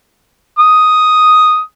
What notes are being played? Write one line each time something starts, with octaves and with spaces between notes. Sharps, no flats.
D#6